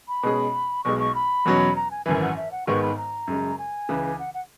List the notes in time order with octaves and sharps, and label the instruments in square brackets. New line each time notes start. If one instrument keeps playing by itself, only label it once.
[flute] B5
[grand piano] B2 G#3 C#4 G#4
[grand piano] B1 B2 G#3 [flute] C#6
[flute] C#6
B5
[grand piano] E2 B2 F#3 C#4
[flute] A#5
G#5
[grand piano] G#1 F#2 E3 [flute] G#5
[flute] F#5
E5
F#5
[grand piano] G#1 G#2 D#3 G#3 B3 [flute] C#6
[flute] B5
A#5
[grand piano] F#2 C#3 G#3
[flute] G#5
[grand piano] C#2 C#3 E3
[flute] F#5
F#5